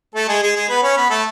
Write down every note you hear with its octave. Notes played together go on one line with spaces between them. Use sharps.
A3 A4
G#3 G#4
G#3 G#4
G#3 G#4
B3 B4
C#4 C#5
B3 B4
A3 A4